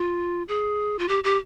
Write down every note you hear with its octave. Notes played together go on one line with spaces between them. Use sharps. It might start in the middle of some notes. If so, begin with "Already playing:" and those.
Already playing: F4
G#4
F4
G4
G4